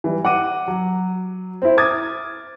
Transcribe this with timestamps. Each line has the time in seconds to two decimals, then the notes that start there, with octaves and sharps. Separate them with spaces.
0.04 E3 G3
0.25 F#5 D6 D#7
0.68 F#3
1.62 C4 E4
1.77 D6 D#6 G#6 A6